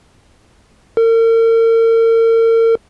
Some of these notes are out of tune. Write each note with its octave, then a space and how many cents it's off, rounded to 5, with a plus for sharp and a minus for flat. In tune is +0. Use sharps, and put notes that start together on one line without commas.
A#4 -40